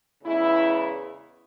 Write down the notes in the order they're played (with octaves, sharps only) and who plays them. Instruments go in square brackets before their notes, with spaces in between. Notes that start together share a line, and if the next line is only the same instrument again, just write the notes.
[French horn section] E2 C#3 E3 G#3 E4